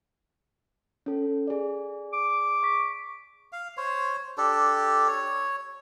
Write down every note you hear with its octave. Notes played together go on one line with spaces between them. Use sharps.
C#4 A4
G#4 D5
D6
C#6 B6
F5
C5 C#5
D4 G4 A4
C#5